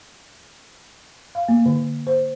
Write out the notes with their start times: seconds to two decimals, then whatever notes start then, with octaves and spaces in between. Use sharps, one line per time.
1.35 F5
1.48 A#3
1.66 D3
2.07 C5